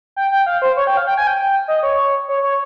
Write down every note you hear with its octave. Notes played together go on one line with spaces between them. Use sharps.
G5
G5
F5
C5
C#5
G5
F5
G5
G#5
G5
D#5
C#5
C#5
C#5